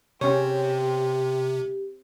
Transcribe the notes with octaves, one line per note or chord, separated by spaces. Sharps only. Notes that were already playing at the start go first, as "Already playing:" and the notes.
C3 C4 C#4 G4 C#5